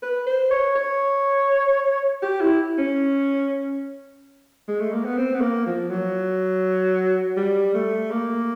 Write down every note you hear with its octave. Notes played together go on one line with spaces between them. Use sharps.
B4
C5
C#5
C#5
G4
E4
C#4
G#3
A3
A#3
B3
C4
B3
A#3
F3
F#3
G3
A3
A#3